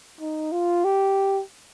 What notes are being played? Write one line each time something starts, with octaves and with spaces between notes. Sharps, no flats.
D#4
F4
G4